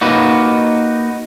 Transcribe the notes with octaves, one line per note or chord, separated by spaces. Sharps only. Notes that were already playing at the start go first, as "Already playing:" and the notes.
A#3 D#4 F#4 B4